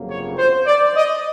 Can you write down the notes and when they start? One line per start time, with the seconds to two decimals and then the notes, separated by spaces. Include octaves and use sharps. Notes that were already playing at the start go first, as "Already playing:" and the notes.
Already playing: G1 F2 C#3 F#3 A#3
0.09 C#5
0.37 C5
0.67 D5
0.96 D#5